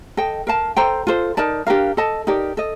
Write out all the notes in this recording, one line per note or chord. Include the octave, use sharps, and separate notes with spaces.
A4 D#5 G5
A#4 F5 A5
A4 C5 G5 A#5
F4 A4 C5
D#4 A#4 D5 A5
D4 G4 A#4 F5
A4 D#5 A5
D#4 G4 A#4 D5
A4 D#5